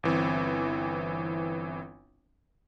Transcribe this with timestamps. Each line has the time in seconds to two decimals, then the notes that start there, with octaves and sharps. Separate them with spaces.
0.03 G1 E3 C4